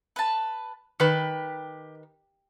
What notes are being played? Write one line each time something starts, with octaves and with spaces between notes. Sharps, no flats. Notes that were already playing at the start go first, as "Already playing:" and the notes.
B4 A5
D#3 G4 B4